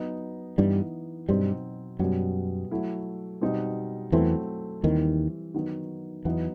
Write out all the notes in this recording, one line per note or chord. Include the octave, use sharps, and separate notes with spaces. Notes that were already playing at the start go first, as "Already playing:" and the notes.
Already playing: F#3 B3 D#4
G2 E3 G3 B3 D#4
G2 B2 F#3 G3 C4 D#4
F#2 B2 F#3 G3 B3
F#3 A3 E4
B2 G3 C4 D#4
E2 E3 F#3 A3 C4 E4
D#2 D#3 E3 G3 C4 E4
D#3 F#3 B3 D#4
E2 E3 F#3 B3 D#4